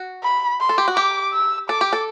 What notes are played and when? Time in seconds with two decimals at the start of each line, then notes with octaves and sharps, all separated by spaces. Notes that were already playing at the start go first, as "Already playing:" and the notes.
Already playing: F#4
0.23 B5
0.61 C6
0.69 A4
0.78 G4
0.88 F#4
0.96 G4 D6
1.33 E6
1.69 A4 D6
1.81 G4
1.93 A4